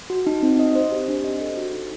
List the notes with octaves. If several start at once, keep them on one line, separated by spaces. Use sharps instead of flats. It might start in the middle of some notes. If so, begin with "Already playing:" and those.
F#4
D#4
C4
D#5
C5
G4
D4
D#5
A4
F#4
D#4